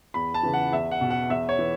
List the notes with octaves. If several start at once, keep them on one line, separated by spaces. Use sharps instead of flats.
E2 B5
A5
C#3 E3
F#5
E2 E5
F#5
B2
F#5
E2 E5
C#5
E3